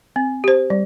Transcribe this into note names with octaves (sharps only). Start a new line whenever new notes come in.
C4
G4 C5
G3